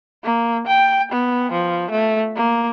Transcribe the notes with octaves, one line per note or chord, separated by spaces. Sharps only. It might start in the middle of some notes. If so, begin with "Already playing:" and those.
A#3
G5
B3
F3
A3
A#3